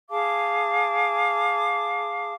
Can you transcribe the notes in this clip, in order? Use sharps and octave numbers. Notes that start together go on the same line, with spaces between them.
G#4 F5 A5 D6